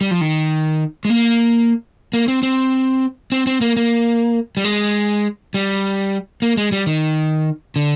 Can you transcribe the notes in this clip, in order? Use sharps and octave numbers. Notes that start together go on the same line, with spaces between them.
G3
F3
D#3
G#3
A#3
A#3
C4
C4
C4
C4
A#3
A#3
G3
G#3
G3
A#3
G#3
G3
D#3
D3